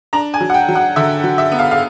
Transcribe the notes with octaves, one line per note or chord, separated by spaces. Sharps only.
D4 A#5
G#5
F#3
F#5
G5
F#3
F#5
D3 E5
F#3
E5
B3
F5
F5